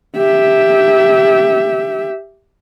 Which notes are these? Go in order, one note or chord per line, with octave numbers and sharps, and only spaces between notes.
G4 E5